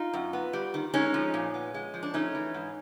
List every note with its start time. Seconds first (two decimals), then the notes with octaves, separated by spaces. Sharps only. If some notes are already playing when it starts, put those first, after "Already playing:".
Already playing: D#4 F4
0.13 F#2
0.33 B3
0.53 G3
0.74 D#3
0.94 G#3 C#4 D#4
1.14 F3
1.34 A#2
1.54 B3
1.74 G#3
1.94 F3
2.03 D4
2.14 A3 C#4 D#4
2.35 E3
2.54 G#2